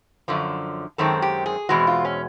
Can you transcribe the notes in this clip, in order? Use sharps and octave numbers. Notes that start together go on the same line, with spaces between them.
F#2 D3 F3
F#2 D#3 G#3 C4 A4
G4
G#4
E2 B2 G#3 C4 F#4
F4
C#4